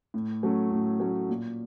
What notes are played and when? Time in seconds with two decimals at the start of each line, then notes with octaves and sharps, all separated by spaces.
0.14 A2
0.43 F#3 A3 C#4
0.71 A2
1.00 F#3 A3 C#4
1.29 A#2